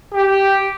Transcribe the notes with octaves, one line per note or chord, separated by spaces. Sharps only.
G4